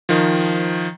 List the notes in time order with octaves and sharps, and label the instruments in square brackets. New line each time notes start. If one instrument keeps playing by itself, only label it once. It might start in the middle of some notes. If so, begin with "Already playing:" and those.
[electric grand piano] D#3 F3